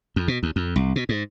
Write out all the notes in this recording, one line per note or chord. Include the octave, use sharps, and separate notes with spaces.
F2
B2
D#2
F2
C2
B2
G#2